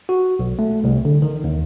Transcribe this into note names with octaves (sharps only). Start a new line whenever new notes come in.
F#4
B1
A3
C2
D3
D#3
D#2